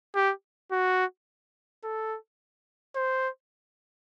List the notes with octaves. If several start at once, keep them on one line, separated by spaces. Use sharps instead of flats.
G4
F#4
A4
C5